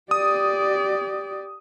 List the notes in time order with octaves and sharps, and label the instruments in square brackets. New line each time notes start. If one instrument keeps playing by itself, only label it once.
[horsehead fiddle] G4 D5 [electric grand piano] D#6